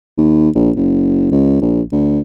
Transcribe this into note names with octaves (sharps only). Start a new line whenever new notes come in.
D#2
A#1
F#1
C#2
A#1
D2